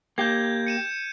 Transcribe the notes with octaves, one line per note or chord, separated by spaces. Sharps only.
A#3 G4 G6 G#6
C#7 D#7 E7